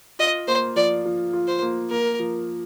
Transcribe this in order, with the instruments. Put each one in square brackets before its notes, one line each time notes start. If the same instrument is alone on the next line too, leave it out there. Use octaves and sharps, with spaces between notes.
[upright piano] F4 [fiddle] D#5
[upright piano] A#3 [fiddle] C5
[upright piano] F3 [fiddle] D5
[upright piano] F3
F4
[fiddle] C5
[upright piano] A#3
[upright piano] A#3 [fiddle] A#4
[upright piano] F3